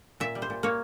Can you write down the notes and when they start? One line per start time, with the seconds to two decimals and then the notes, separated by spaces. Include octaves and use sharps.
0.20 A#2 E5
0.35 G3
0.42 C5
0.50 A#2
0.63 A#3 C#5